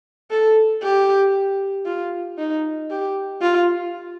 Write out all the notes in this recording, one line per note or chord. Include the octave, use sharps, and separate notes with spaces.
A4
G4
F4
D#4
G4
F4